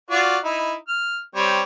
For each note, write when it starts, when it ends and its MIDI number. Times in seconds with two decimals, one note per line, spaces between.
0.10 0.37 65
0.10 0.37 66
0.10 0.37 74
0.44 0.74 63
0.44 0.74 64
0.88 1.20 89
1.35 1.62 55
1.35 1.62 60
1.35 1.62 73